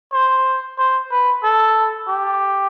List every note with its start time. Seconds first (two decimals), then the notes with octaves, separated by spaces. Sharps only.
0.12 C5
0.78 C5
1.11 B4
1.43 A4
2.08 G4